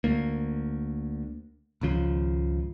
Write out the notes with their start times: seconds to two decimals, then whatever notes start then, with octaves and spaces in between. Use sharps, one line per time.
0.04 D2 A#3
1.81 G#1 C#2 C#3 F3